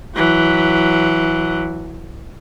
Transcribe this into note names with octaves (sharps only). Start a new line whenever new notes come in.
E3 F#3